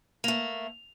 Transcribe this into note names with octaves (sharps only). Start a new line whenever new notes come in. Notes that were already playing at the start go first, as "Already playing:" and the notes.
A3 A#3 F7